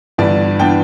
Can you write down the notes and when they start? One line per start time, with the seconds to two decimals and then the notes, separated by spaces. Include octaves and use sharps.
0.18 G1 G2 E3 B3 D4 D5
0.60 E3 B3 D4 G5